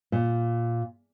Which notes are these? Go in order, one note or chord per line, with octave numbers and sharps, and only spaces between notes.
A#2